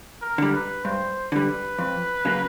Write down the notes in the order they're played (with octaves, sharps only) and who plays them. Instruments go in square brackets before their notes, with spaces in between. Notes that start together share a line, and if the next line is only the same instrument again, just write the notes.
[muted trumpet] A#4
[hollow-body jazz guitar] D3 G3
[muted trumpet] B4
[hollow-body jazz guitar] G2 [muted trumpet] C5
[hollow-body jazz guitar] D3 G3 [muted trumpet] B4
[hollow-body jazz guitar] F2
C#3 F#3 A#3